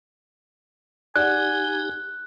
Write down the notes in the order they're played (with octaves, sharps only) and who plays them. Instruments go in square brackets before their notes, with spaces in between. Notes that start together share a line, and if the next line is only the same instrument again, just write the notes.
[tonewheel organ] D#4 G4 [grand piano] D5 F#5 [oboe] G#5 [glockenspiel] F#6